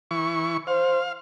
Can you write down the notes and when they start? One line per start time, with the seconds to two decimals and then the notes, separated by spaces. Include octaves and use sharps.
0.11 E3 C#6
0.67 C5 F5